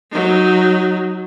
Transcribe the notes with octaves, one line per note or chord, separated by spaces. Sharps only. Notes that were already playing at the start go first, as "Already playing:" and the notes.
F#3 D#4